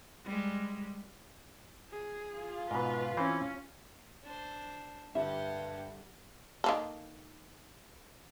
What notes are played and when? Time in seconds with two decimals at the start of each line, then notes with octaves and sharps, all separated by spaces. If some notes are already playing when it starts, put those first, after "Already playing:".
0.24 G3 G#3
1.90 G#4
2.37 F4
2.71 G#2 B2 B4
3.17 E3 C4 C#4
4.23 D4 C5
5.15 G2 D3 G3 G4 E5 F#5
6.64 D#3 A#3 A4